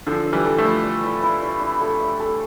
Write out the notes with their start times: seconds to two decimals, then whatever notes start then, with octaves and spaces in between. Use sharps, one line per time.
0.07 D3 F3 A4
0.26 E5
0.33 E3 G3
0.46 A4
0.58 F3 A3
0.65 E4
0.84 E5
1.03 E4
1.23 E4
1.42 E4
1.61 E4
1.81 A4
2.00 E5
2.20 A4